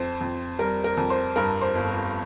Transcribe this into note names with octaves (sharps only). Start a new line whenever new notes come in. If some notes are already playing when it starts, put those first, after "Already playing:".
Already playing: F2 C5
F2
G3 A#4
A#4
F2
C5
G2 A#4
C5
G1